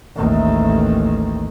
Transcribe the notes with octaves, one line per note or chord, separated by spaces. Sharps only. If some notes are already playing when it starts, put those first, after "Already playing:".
A1 D#2